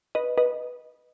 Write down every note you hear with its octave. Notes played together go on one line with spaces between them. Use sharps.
B4 D#5
B4 D#5